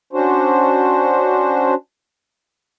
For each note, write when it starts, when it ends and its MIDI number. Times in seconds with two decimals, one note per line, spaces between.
0.13 1.74 61
0.13 1.74 62
0.13 1.74 66
0.13 1.74 72